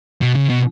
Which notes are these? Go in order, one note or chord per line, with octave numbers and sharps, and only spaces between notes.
B2
C#3
B2